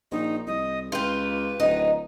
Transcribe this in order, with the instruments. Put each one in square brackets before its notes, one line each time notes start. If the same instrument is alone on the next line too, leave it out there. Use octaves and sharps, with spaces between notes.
[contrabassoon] A#1 [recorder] D#4
[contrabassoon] C2 [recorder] D#5
[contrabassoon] C#2 [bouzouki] F4 G4 [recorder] B4
[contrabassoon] D1 [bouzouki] D#4